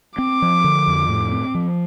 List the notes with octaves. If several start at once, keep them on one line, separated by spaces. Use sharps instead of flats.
C4 D6
F3
D3
F2
A2
C4
F3